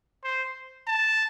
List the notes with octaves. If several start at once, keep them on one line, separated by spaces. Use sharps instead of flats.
C5
A5